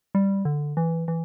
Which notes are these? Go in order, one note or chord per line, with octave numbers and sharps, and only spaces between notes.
G3
D3
E3
E3